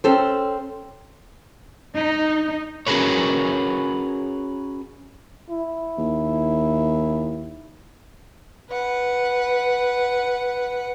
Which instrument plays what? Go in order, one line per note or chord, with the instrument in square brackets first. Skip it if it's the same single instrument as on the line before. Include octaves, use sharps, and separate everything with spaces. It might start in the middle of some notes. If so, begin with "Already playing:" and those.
[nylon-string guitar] C4 C#4 A4 C5
[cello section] D#4
[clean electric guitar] C#4 F#4 G#4 A#4 B4 C#5
[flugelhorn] E4
[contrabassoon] D#2
[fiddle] B4 F#5